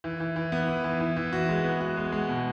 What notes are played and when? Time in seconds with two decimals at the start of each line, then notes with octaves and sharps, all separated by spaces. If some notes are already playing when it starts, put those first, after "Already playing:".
0.04 E3
0.20 E3
0.36 E3
0.52 B3
0.68 E3
0.84 E3
1.00 E3
1.17 E3
1.33 F#4
1.49 G#3
1.64 B3
1.80 F#4
1.97 G#3
2.12 G#3
2.29 B2